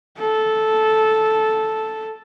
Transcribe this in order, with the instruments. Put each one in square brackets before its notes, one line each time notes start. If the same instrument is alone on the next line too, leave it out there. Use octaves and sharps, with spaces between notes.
[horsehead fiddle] A4